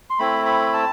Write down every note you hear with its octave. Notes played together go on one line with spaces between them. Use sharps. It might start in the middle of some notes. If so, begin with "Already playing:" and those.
C6
A3 C4 E4 B5
B5
A5